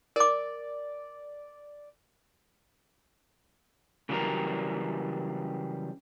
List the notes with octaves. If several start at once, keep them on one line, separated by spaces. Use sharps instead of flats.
A#4 D5 D6
C#3 E3 F#3 G3 D4 A#4